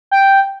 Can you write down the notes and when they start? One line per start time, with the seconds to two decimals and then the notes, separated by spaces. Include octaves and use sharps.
0.11 G5